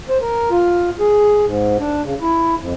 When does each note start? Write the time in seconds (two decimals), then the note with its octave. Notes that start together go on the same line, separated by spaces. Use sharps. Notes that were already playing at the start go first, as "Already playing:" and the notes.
0.09 C5
0.21 A#4
0.50 F4
1.00 G#4
1.46 G#2
1.80 D4
2.04 C#3
2.21 E4
2.59 F2